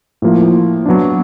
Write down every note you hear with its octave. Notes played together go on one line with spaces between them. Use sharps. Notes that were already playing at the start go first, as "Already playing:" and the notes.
A2 F3 A#3
F#3 B3 D4